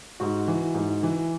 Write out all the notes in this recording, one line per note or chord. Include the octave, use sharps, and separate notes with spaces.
G#2 F#4
E3
G#2
E3